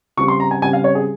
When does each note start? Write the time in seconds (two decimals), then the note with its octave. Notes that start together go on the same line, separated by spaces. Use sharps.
0.17 C#3 G3 C4 C#6
0.28 C6
0.40 A#5
0.51 G#5
0.62 C#3 G3 C4 G#5
0.73 F5
0.84 C#5
0.95 G#4